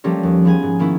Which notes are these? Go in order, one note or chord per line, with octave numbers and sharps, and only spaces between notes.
F3 G3 A3 A#3 C#4 A#4
D#2
F3 B3 G#4 G#5
G#2
D#3 A#3 B3 C#4 E4